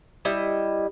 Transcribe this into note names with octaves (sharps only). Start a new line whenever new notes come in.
G3 E4 D#5